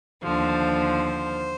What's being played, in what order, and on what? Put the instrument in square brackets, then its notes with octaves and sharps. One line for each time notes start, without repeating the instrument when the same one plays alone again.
[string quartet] D#2 D3 F3 C5